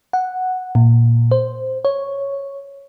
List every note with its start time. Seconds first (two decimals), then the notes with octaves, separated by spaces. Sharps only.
0.13 F#5
0.75 A#2
1.31 C5
1.85 C#5